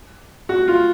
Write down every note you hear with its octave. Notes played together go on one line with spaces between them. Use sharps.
F#4
F4